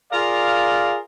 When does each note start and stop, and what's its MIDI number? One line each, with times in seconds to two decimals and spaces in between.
0.12 0.97 65
0.12 0.97 68
0.12 0.97 70
0.12 0.97 74
0.12 0.97 77